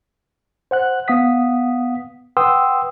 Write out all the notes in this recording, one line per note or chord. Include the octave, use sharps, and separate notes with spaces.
C5 F#5 F#6
B3 F5 F#5 D#6 B6
B4 F#5 G5 C6 D#6 E6